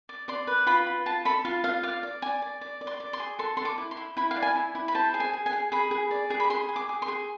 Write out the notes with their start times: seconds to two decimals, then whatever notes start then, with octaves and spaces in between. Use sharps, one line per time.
0.09 D5
0.28 D5 C6
0.47 B4
0.66 F4 B5
0.86 F4
1.06 F4 A5
1.25 A4 B5
1.45 F4 F5
1.64 F4 F5
1.83 D5 F5
2.03 D5
2.22 D5 G#5
2.42 D5
2.61 D5
2.81 D5
2.87 C6
3.00 D5
3.13 C6
3.20 G#4
3.39 A4 C6
3.57 A4 C6
3.65 D6
3.78 E4
3.91 C6
3.97 E4
4.17 E4 B5
4.31 F5
4.36 D5
4.42 G#5
4.56 E4
4.75 E4
4.88 B5
4.94 C5 A5
5.14 G#4
5.20 G#5
5.33 G#4
5.46 G#5
5.53 G#4
5.72 G#4 B5
5.91 G#4
6.11 D5
6.30 G#4
6.40 B5
6.50 G#4 C6
6.69 G#4
6.76 D6
6.89 G#4
7.02 C6
7.08 G#4